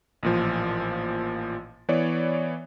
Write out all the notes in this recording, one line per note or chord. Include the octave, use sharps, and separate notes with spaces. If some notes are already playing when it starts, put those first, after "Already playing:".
A1 A#2 F3
E3 B3 C#5 D5